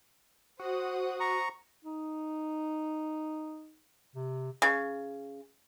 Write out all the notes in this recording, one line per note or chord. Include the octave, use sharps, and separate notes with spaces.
F#4 C5 F#5 D#6
A#5 C#6
D#4
C3
C#3